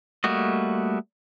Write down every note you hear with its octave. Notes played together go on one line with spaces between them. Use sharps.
G3 A3 A#3 F#4 D#5